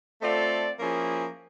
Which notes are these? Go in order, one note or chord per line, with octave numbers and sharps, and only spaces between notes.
A3 C4 F4 A4 D5
F3 A#3 C#4 E4 G#4